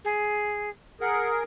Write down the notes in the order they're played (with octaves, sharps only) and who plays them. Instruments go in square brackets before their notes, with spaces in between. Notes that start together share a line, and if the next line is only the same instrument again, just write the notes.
[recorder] G#4
[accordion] G#4 A#4 [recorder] F#5